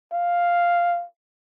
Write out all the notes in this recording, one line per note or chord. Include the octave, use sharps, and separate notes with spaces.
F5